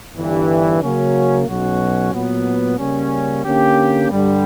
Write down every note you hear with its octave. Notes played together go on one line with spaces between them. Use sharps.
G1 G2 E3 G3
C#3 F#3 A#3 C#4 F#4
B1 B2 F#3 C#4 F#4
A#2 F#3 B3
C#3 G3 A#3 C#4
D3 A#3 C#4 G4
G2 D3 G3